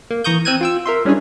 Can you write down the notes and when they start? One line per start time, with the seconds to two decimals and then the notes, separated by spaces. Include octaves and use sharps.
0.11 A#3
0.24 E3 A#5 C#6 D#6 G6
0.45 C4 E6 F#6 G#6 D#7
0.61 F4 G5 E6
0.86 A#4 E5 C6
1.05 G3 C#4 D4 E4 G#4 C#5